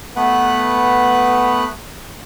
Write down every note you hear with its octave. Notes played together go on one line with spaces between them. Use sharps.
A3 B3 B4 F#5 F#6